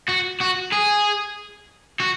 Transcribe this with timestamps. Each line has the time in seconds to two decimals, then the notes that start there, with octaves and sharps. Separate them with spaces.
0.09 F#4
0.41 F#4
0.73 G#4
2.00 F#4